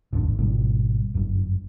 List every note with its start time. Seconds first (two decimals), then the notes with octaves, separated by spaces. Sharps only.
0.13 D1 G#1 E2 D3
0.38 G#1 B2 G3
1.14 G1 F#2